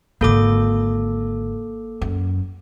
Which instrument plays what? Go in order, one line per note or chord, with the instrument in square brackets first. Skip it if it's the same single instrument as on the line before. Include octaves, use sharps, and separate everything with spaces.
[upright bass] G#1 D3 [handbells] A#3 A4 D6
[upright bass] F#2